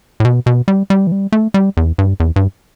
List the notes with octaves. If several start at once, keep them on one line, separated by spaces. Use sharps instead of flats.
A2
B2
B2
G3
G3
E3
G3
A3
G3
E2
G2
E2
G2